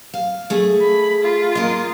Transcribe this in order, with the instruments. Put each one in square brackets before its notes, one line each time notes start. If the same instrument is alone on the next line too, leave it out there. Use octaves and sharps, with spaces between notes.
[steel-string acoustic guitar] F5
A3 G#4
[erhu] B5
F4
[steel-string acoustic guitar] A#3 D#5